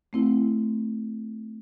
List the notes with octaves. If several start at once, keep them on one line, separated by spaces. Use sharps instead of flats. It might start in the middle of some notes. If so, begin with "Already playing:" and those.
A3 C4 E4